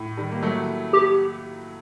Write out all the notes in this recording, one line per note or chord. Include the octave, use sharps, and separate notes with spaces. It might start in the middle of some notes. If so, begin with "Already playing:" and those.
Already playing: A2
D#3 G3
A#3
F#3 A3
G4